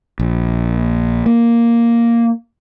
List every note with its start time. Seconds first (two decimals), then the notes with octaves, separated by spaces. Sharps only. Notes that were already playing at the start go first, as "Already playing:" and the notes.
0.19 A#1
1.26 A#3